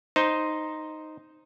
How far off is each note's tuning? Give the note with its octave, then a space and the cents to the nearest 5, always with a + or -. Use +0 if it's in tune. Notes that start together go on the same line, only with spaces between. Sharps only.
D#4 +0 C5 +0